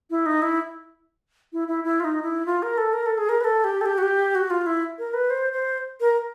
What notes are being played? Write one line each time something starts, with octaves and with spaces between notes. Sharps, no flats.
E4
D#4
E4
E4
E4
E4
F4
D#4
E4
F4
A#4
A4
A#4
A4
G#4
A#4
B4
A4
G4
A4
G4
F#4
G4
F#4
F4
E4
A#4
B4
C5
C5
A#4